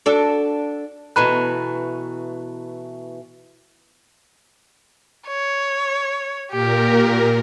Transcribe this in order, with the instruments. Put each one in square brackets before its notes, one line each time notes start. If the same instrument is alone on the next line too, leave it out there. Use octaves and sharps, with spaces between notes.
[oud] D4 F#4 A4
[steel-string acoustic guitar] B2 E3 A3 [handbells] A#5 B5 F#6
[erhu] C#5
[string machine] A#2 A#4 [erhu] G4